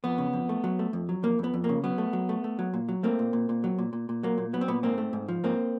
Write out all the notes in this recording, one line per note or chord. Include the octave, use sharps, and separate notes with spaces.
F2 B3
C#3
F2
A3
F#3
A3
F2
F#3
F2 A#3
F2 B3
F2
A#3
C#3
F#3 B3
A3
F#3
A3
A3
F#3
A#2
F#3
A3 A#3 C4
A#2
A#2
A#2
F#3
A#2
A#2
A#2
F#3 A#3
A#2
F#3 B3
C4
A#2 B3
G#2 A#3 C4
A3
G#2
F3
G#2 A#3 C4